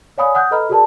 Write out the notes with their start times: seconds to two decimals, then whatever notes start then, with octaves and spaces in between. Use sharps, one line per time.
0.18 C#5 D5 F5 G#5 B5 D#6
0.35 F#5 D#6 F#6 G6
0.51 A4 B4 D#5 A#5 B5 F6
0.69 F#4 G#4 A#4 D5 A5